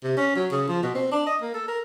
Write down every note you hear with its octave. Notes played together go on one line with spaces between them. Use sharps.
C3
C#4
F#3
C#3
F3
B2
C4
D4
D#5
A#3
A4
A#4